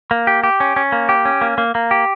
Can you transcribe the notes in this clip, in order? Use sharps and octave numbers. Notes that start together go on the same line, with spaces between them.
A#3
G4
G4
C#4
C#4
A#3
G4
C#4
A#3
A#3
A#3
G4